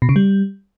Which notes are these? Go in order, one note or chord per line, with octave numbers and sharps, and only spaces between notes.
B2
C#3
G3